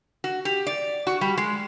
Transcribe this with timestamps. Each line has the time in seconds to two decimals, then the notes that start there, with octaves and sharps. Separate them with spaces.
0.24 F#4
0.45 G4
0.67 D5
1.07 F#4
1.21 G3
1.37 G#3